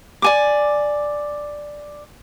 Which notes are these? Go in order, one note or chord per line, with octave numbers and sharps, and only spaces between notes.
D5 G#5 D6